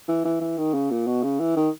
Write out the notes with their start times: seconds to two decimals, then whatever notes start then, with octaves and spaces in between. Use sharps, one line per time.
0.08 E3
0.25 E3
0.41 E3
0.58 D#3
0.74 C#3
0.90 A#2
1.07 B2
1.23 C#3
1.40 E3
1.56 D#3